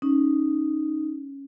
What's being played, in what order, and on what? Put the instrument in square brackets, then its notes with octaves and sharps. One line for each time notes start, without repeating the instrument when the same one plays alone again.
[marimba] C#4 [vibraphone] D#4